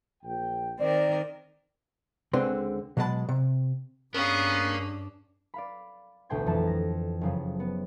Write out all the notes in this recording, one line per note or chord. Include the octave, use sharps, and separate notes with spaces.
A#1 G5
D#3 C4 A#4 D5
C#2 D3 G#3 C4 B4 C6
B2 F#3 G#3 B3 A5 B5
C3
G2 B3 C#4 D4 G#4 A#4 F5
D5 F5 B5
A1 D2 B2 G5 C6 G#6
F2 E3 A5
A#6
F#1 C#3 F3
B3